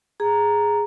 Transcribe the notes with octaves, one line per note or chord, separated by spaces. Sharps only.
G#4 A#5